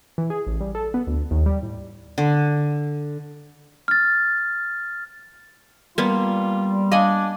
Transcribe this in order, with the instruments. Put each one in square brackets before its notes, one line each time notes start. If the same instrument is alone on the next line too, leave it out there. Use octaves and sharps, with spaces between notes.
[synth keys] E3
G#4
A1
G3
A4
B3
D2
D#2
G3
A2
[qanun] D3
[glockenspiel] F6 A6
[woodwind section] G3 [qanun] A#3 B3 [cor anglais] F4
[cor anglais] D4 [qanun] D#5 F#5 G#5 [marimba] F5